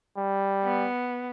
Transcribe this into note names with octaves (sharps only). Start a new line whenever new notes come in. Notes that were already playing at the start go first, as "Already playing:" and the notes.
G3
B3